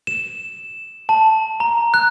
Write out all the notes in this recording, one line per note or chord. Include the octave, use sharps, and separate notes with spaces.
E7
A5
A#5
F#6